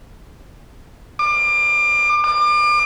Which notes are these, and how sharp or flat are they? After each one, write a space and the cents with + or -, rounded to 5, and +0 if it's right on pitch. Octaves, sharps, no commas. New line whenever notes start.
D6 +30
D6 +35